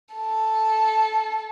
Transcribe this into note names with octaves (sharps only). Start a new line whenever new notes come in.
A4